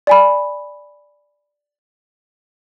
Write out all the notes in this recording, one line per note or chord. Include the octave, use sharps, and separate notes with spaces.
D5 G#5 B5